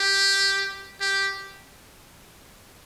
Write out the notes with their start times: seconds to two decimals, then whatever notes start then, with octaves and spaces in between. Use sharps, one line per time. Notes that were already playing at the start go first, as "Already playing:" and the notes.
Already playing: G4
1.01 G4